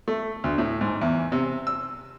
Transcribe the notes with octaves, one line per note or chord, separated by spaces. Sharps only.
A3
D2
A2
G#2
E2
C3
E6